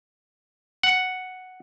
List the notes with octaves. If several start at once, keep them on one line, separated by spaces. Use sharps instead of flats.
F#5